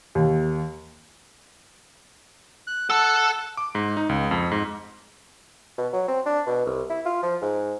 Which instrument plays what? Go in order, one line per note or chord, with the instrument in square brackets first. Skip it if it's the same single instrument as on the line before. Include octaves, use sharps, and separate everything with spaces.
[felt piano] D#2
[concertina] F#6
[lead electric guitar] A4 A5 [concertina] F#5
[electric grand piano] D6
G#2
D#4
C#2
F2
G#2
[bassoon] B2
F#3
C4
D4
B2
C2
E4
F4
F3
G#2